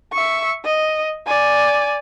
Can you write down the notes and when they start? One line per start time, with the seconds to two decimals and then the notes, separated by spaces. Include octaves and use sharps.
0.13 E5 C#6
0.65 D#5
1.27 D5 G#5